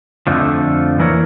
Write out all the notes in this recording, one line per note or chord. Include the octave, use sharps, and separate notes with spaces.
F2 D3 F3 A3
E3 A#3 E4 A#4 C#5